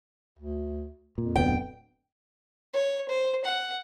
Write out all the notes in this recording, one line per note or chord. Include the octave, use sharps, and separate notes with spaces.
D2
F2 A#2
D1 D2 B3 G5
C#5
C5
F#5